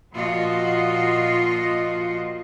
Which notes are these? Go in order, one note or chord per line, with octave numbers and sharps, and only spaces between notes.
A#2 F3 F4 F#4 D#5